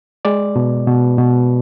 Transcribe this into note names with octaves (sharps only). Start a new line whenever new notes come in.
G#3 D5
B2
B2
B2